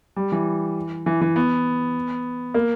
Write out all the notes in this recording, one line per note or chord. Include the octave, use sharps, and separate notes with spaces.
G3
E3
E3
E3
B3
A#3